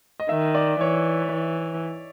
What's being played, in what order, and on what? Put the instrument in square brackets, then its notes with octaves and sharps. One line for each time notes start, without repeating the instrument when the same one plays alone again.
[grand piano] D#5
[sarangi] D#3 [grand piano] E5
[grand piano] D5
[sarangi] E3 [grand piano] C#5
[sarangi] E3